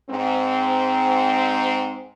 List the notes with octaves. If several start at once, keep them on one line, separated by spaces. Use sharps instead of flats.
G#2 C4